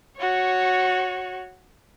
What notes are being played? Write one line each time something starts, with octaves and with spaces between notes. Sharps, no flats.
F#4 C#5